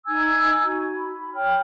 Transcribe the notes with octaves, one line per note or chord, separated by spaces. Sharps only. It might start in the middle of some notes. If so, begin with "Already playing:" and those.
D#4 G#5 E6 G#6
F#4
B5
C#5 G5 F6